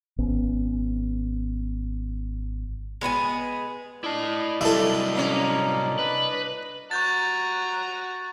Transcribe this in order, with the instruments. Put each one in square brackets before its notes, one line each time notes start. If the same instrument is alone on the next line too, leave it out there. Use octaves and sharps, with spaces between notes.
[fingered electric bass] G#1 B3 C#4
[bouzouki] G#3 B3 E4 G#4
[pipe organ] D4 D5 D#5 [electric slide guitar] E4 A5
[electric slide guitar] C3 F#3 G3 [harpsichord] E4 A4
[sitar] A#3 C#4
[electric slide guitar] B4
[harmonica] F#4 A#5 [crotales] C#6 G6 A6